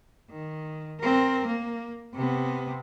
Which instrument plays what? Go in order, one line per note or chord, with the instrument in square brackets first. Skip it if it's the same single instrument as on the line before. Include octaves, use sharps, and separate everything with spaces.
[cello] D#3
C4 A#4
A#3
C3 B3